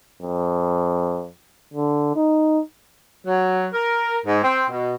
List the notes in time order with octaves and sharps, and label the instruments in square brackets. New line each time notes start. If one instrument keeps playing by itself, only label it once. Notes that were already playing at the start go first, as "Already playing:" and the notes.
[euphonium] F2
D3
D#4
[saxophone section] F#3
A#4
G#2
C4
B2